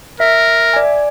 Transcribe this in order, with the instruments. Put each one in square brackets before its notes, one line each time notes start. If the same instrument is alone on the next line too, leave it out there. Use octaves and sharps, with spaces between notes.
[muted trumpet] A#4 [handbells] E5
[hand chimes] D5 G#5